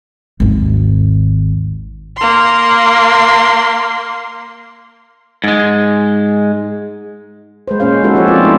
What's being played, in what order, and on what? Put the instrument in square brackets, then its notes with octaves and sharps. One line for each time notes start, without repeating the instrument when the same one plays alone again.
[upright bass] G#1 D#2
[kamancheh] A#3 C6
[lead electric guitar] G#2 G#3
[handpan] G#3 B4 C5
A#2 A#3 C#4 C5 F5
G#3 C#4 D#4 F#4 A4 B4
F3 F4 G4 A4 B4 C#5
C4 F4 A#4 D5
A3 A#3 D#4 E4